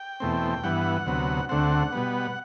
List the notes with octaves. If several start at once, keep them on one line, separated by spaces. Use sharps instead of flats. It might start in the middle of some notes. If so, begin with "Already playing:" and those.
Already playing: G5
E2 B2 A3 C4
G2 E3 B3 F#5
D2 C3 F#3 B3
D2 D3 A3 C4 F#5
B2 G3 B3